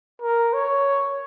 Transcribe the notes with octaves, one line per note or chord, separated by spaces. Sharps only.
A#4
C#5